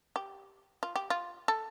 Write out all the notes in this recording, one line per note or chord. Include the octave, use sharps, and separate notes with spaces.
G4
F4
G4
F4
A4